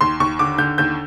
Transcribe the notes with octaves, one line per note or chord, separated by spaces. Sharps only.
D#2 C6
D#2 C#6
D3 D6
D3 G6
D#2 G6